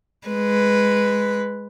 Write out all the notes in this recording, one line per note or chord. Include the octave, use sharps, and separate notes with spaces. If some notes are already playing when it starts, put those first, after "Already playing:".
G#3 B4